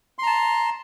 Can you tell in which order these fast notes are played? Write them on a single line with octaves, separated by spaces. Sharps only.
C6 A#5 A5